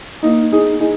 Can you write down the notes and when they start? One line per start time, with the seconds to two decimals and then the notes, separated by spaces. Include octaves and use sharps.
0.23 A#3 D#4
0.52 D#4 G#4
0.80 D#4 G#4